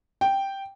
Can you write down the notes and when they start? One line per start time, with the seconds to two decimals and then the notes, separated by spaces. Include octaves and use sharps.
0.21 G5